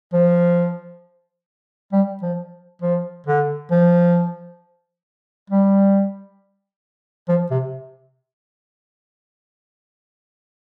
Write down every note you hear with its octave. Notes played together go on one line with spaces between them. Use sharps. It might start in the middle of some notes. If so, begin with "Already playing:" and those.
F3
G3
F3
F3
D3
F3
G3
F3
C3